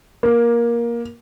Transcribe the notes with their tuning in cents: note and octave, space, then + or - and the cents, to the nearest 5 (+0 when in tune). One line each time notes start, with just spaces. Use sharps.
A#3 +15